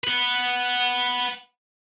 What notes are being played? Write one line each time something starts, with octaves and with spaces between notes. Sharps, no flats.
B4 F#5